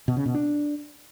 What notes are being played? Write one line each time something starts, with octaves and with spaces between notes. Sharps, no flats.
B2
C#3
B2
D4